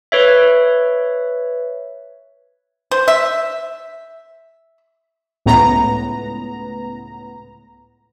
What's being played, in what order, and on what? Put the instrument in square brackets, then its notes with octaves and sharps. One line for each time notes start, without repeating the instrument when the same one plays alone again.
[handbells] B4 C#5 E5
[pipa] C5
E5
[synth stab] C#2 A2 B3 A#5